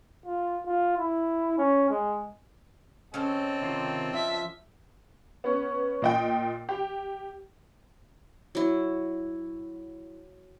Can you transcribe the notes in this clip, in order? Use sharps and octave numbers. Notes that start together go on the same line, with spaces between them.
F4
F4
E4
C#4
G#3
C#3 C4 C#4 A4 D#5
C3 D#3 F4
F3 E5
B3 C#4
A#2 D#5 G5
G4
F#3 E4